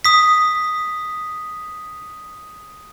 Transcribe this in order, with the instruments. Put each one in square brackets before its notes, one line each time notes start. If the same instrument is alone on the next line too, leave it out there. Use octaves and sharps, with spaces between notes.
[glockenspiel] D#6 B6